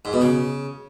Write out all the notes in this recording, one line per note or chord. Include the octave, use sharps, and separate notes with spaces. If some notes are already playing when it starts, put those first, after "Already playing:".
G#2
B2
C#3